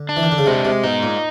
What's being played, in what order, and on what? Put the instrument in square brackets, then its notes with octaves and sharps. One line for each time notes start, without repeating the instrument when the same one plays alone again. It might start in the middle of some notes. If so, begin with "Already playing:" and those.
Already playing: [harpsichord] D3
[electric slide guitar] D4
[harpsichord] E3
D#3
D3
C#3
[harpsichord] C3 [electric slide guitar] G#3
[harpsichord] C3
[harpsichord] B2 [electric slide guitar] D#4
[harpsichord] A#2